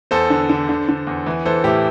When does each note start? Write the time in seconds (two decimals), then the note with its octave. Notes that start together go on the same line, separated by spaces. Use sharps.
0.11 E2 A4 C5
0.30 D3
0.49 D3
0.69 D3
0.89 D3
1.07 E2
1.26 E3
1.45 E3 A4 C5
1.64 A2 E4 G4